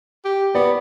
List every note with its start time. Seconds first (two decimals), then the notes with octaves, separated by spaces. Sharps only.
0.25 G4
0.55 B3 D5